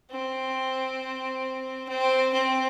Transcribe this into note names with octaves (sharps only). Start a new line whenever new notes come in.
C4
C4
C4